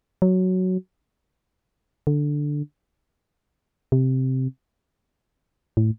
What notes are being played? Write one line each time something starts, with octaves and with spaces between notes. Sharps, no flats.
F#3
D3
C3
A2